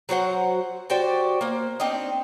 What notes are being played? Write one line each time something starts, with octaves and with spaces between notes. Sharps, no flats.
F#3 F#4 C5 F#5
F#4 G4 C5 D5
A#3 C5
C4 D4 D#4